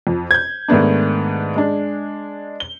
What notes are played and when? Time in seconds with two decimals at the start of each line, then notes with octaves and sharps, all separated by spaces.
0.07 F2
0.31 G6 G#6
0.68 G#2 D#3 A3 B3 D4
1.56 G#3 D4
2.60 G7